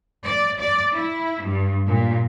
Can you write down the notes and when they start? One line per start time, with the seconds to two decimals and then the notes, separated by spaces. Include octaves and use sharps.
0.24 D5
0.60 D5
0.93 E4
1.43 G2
1.87 A#2